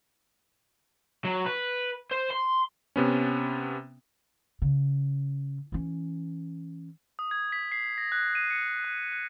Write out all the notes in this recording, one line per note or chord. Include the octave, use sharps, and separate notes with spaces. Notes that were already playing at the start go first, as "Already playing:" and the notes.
F#3
B4
C5
C6
C3 B3 C#4
C#3
E3 C#4
D#6
G#6
B6
C7
A#6
F#6
D#7
C#7
F#6
F#6